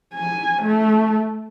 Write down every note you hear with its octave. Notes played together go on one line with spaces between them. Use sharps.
G#5
A3